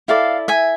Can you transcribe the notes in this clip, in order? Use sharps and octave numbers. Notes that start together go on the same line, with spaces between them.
E4 A4 D5 F5
E5 G#5